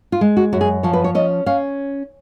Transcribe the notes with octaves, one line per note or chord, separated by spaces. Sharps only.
F4
G#3
F#4
F#2 F#4
G#4
F3 C#5
B4
C#5
C#4 D#5
C#4 F5